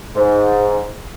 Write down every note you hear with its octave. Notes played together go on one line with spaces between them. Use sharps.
G#2